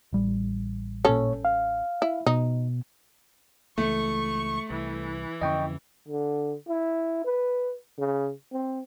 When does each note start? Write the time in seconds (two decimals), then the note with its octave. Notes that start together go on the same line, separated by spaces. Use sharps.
0.13 A1 G3
1.05 A#2 C#4 A4 C#5
1.45 F5
2.02 E4
2.26 B2 D#4
3.78 C#2 E3 A3 C#6
4.70 C2 E3
5.41 F2 D3 C#4 D#5 G5 C#6
6.08 D3
6.68 E4
7.25 B4
7.98 C#3
8.52 C4